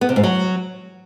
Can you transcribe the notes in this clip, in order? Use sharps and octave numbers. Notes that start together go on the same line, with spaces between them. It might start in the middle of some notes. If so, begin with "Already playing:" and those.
B3
C3
G#2
F#3